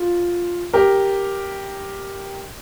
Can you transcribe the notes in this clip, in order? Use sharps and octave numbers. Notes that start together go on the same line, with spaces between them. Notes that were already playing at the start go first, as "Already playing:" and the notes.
Already playing: F4
G4 A#4